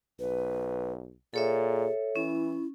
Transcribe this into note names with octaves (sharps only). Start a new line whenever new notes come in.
B1 B4
A#2 G#4 A4 C#5 E5
E3 C#4 E4